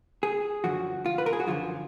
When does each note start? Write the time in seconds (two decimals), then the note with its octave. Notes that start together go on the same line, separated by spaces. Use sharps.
0.23 G#4
0.64 F#2 D3 F3 F#4
1.06 F4
1.18 B4
1.26 A#4
1.33 G#4
1.40 F#4
1.47 F#2 D3 F3 F4